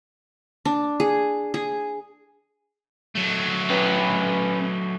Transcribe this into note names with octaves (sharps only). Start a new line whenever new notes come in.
D4
G#4
G#4
F#3 A3
C#4 B4